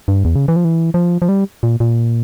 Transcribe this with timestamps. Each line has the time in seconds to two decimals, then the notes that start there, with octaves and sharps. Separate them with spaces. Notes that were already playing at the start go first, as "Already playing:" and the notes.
0.08 G2
0.25 E2
0.36 C#3
0.48 E3
0.56 F3
0.65 E3
0.94 F3
1.22 F3
1.29 G3
1.63 A#2
1.80 A#2